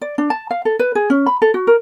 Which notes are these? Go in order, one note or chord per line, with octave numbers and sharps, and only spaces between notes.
D5
D4
A5
F5
A4
B4
G#4
C#4
B5
A4
F#4
A#4